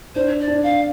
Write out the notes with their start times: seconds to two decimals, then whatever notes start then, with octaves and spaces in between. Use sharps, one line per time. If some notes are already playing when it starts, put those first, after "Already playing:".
0.15 D4 C5
0.40 D5
0.47 D4
0.63 F5